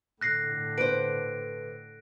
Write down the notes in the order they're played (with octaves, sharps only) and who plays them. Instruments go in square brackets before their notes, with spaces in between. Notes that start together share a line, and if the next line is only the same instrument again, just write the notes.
[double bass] A2 D3 [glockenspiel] F#6 A#6 C7
[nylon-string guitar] B4 C5 [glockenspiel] D7